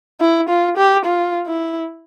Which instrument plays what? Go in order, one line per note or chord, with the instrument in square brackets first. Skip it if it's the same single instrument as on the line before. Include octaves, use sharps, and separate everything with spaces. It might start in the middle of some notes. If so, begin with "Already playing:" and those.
[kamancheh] E4
F4
G4
F4
E4